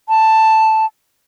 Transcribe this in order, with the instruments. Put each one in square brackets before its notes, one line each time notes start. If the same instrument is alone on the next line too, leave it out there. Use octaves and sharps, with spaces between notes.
[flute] A5